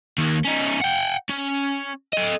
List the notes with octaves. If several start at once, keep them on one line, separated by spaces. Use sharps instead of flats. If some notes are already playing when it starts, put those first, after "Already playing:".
D#2 D#3
C#4 D#4
F#5 G5
C#4
A4 D#5